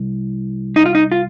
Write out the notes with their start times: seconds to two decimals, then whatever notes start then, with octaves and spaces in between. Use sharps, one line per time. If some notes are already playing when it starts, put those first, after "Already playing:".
Already playing: C2
0.76 D#4
0.86 F4
0.95 D#4
1.12 F4